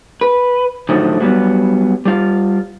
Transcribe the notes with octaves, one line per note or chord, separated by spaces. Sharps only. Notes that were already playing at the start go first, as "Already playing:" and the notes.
B4
A2 D3 D#3 F3 F#3 A3
F#3 G3 B3
G3 F4